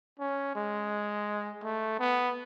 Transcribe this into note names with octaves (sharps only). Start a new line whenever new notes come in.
C#4
G#3
A3
B3